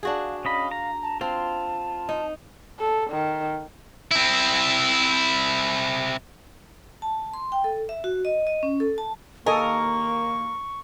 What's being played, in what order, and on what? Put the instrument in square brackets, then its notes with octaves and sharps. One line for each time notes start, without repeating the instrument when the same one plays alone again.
[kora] D4 F#4 G#4 [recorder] F5
[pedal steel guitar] C#4 D#5 B5 [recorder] F5
[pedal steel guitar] A#5
[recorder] A5
[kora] C4 [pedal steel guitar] F4 [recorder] A5
[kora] D#4
[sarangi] A4
D#3
[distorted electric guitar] C4 E4
[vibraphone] A5
C6
G5
A4
E5
F#4
D#5
D#5
C#4
A4
A5
[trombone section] D#2 A#3 [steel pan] A4 D#5 G#5 [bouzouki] A#4 [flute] C#6